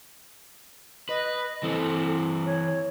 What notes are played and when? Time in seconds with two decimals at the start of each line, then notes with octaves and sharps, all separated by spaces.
1.09 B4 D#5
1.63 E3 C4 A4
2.46 C#5